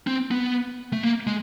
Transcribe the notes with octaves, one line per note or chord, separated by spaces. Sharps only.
C4
B3
A3
A#3
G#3